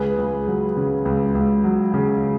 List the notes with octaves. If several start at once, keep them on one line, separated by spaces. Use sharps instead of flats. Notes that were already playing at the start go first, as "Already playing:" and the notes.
Already playing: C#2 G#4 B4
C#2
F#3
C#3
C#2
C#2
F#3
C#3